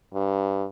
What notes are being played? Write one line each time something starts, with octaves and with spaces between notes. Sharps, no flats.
G2